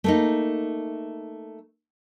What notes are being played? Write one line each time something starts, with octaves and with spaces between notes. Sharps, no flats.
A3 A#3 D#4